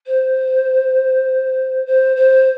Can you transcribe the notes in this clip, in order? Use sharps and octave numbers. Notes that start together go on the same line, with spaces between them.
C5
C5
C5